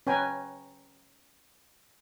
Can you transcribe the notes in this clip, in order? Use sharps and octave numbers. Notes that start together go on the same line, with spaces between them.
C#4 B4 G5 G#5 A#5